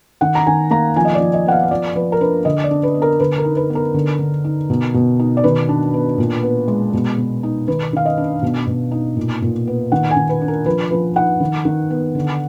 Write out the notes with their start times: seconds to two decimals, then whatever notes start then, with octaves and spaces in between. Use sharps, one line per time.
0.21 D#3 F#5
0.35 A#5
0.47 D#3 G#5
0.71 A#3 A#5
0.96 F3 G#5
1.05 D#5
1.15 D5
1.21 F3
1.34 D#5
1.46 B3 F#5
1.52 F5
1.63 B4
1.71 F3 D5
1.95 F3 B4
2.12 A#4
2.21 D4 B4
2.45 D3 D#5
2.64 D5
2.71 D4
2.83 B4
2.95 B3
3.02 A#4
3.20 D3 B4
3.38 A#4
3.44 D#4
3.57 B4
3.70 B3
3.75 A#4
3.94 D3
4.19 D3
4.44 D#4
4.70 B2
4.94 B2
5.19 D#4
5.37 D5
5.44 D#3 B4
5.69 D4
5.94 B3
6.18 A#2
6.43 B3
6.68 G#3
6.94 B2
7.18 B2
7.43 D#4
7.68 D#3 B4
7.93 D#3 F5
8.05 D#5
8.17 D4
8.43 B2
8.67 B2
8.91 D#4
9.17 A#2
9.42 A#2
9.67 B3
9.92 D#3 F#5
10.11 G#5
10.16 D#3
10.29 B4
10.41 D4
10.48 A#4
10.66 F3 B4
10.91 F3 B4
11.16 D#4 F#5
11.40 D#3
11.65 D#3
11.90 B3
12.15 D3